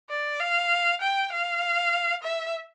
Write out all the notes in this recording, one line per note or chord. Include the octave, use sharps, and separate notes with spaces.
D5
F5
G5
F5
E5